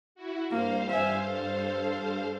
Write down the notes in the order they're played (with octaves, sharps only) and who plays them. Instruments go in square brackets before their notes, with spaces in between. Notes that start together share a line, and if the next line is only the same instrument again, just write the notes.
[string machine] E4 F#4
[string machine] G2 C5 F5 [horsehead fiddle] A#3
[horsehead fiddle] E5 G#5
A4